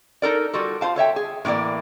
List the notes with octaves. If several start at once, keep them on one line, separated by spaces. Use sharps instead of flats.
D#4 A4 A#4 D5
G3 F4 F#4 A4
F4 C5 F5 A5
A4 C#5 E5 G5
G#4
A2 C#3 E3 A#3 D5